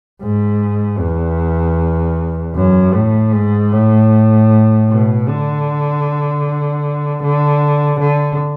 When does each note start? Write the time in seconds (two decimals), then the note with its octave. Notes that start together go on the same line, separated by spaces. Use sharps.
0.22 G#2
0.99 E2
2.55 F#2
2.94 A2
3.33 G#2
3.72 A2
4.89 B2
5.28 D3
7.23 D3
8.00 D3